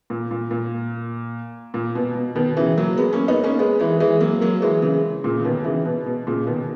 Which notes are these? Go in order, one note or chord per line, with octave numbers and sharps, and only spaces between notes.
A#2
A#2
A#2
A#2
B2
B2
B2 D#3
C#3 E3
F#3 A#3
G#3 B3
A#3 C#4
B3 D#4
A#3 C#4
G#3 B3
E3 G#3
E3 G#3
F#3 A#3
F#3 A#3
E3 G#3
C#3 E3
A#2 C#3
C#3
B2 D#3
C#3 E3
B2
B2
A#2 C#3
B2 D#3